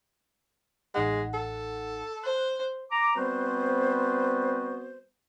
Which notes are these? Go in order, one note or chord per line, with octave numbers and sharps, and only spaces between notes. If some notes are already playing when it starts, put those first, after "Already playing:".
A1 G#3 D#4 F#5
A4
C5 F#6
A#5 D6
G3 B3 C4 F#4 B4 C5